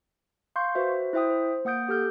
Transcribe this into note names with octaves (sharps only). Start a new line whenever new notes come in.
F5 C6 C#6 G6
F#4 B4 C5 E5
E4 C5 E5 G5 D#6
C5
A#3 F#5 D#6 G6 D7
G4 A4 F6 G6